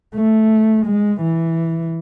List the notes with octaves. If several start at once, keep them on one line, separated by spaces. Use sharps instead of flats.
A3
G#3
E3